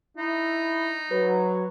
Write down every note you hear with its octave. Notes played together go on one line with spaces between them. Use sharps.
D#4 E4
F#3 B4